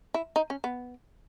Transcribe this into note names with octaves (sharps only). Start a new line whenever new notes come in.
E4
D#4
C#4
B3